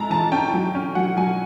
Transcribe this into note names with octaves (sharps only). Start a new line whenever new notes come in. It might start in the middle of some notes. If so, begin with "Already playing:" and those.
Already playing: G#3 E4 A5 A#5
E3 A5
C#4 G5
F#3
C#4
F#3 F#5
F#3 G#5